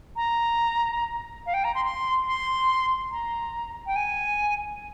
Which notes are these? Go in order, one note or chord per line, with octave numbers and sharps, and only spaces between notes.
A#5
F5
G5
A#5
C6
C6
C6
A#5
G5
G#5